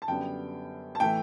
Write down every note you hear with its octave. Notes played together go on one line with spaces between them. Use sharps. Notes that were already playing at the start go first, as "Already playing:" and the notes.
A5
F#2 D3 G3 B3 G5
A5
A2 E3 A3 G5